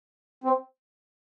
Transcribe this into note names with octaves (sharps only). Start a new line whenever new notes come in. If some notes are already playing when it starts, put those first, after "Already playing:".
C4